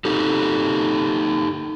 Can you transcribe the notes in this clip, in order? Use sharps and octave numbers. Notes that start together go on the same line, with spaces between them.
D#4 G4 A4